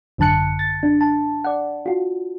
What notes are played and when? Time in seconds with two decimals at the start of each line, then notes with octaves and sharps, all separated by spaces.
0.18 G#1 F#2 D3 A5 F#6 C#7
0.59 A6
0.83 D4
1.01 A5
1.44 D5 F#5
1.86 F4 F#4